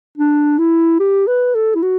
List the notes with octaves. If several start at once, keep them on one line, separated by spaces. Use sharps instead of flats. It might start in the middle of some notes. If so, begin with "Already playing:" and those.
D4
E4
G4
B4
A4
E4
F#4